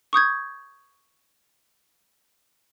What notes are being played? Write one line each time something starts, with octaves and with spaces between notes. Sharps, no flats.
C#6 D#6 G6 G#6